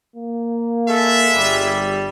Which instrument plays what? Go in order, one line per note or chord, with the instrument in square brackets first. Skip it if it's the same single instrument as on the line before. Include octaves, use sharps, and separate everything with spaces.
[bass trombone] A#3
[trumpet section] G#3 G#4 E5 [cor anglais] A4
[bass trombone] G1 [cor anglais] G3